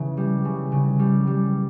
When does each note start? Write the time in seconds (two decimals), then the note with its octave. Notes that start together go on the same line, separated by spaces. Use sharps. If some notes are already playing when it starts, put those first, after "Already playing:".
Already playing: C#3 E3
0.17 G3
0.45 C#3
0.72 C#3
0.99 G3
1.27 G3